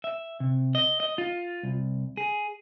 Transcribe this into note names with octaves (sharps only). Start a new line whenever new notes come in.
E5
C3
D#5
D#5
F4
C2
G#4